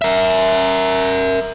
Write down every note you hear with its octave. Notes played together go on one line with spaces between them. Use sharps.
A#4 E5